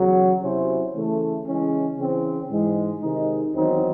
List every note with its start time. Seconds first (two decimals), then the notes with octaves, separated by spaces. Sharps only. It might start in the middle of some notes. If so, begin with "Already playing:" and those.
Already playing: E2 C#3 F#3
0.41 C3 F#3 C#4 E4 C5
0.93 C#3 E3 A3
1.45 C#3 E3 G#3 C#4
1.97 C#3 E3 C4
2.49 G#2 E3 G#3
3.01 C3 D#3 G#3 D#4
3.54 E2 D#3 F#3 C4 D#4